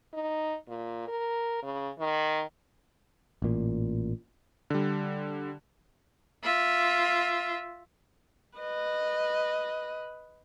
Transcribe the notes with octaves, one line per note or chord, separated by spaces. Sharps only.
D#4
A#2
A#4
C#3
D#3
A1 A#2
D3 G3
F4 E5
B4 D#5